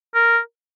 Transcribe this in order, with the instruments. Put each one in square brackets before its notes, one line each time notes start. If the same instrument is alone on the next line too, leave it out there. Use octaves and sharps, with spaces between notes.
[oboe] A#4